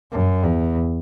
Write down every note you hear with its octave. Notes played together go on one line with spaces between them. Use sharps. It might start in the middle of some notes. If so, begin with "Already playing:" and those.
F#2
E2